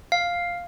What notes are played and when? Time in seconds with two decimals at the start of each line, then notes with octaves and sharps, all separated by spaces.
0.12 F5